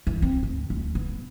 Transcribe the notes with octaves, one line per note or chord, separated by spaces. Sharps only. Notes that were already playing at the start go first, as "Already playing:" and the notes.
E3
C4
D2
D2
B3